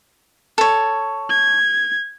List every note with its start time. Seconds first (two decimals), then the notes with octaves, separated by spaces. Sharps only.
0.58 A4 C#5
1.30 G#6